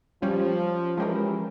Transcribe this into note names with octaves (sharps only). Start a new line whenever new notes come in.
F3 G3 C#4 F4
E3 F3 G#3 C#4 G4 A#4